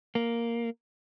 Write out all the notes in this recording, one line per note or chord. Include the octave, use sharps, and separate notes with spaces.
A#3